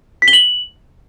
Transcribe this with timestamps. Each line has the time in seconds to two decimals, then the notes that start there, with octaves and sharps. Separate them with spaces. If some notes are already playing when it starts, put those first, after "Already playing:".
0.22 B6
0.28 G7
0.33 F#7